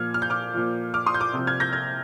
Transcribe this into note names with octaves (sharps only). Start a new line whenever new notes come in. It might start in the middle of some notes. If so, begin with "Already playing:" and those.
Already playing: A#2 F3 F6 G#6
F6
G6
D6 F6
A#2 F3
D6 F6
C6 D#6
G6
D6 F6
C3 F3
F6 G#6
G6 A#6
F6 G#6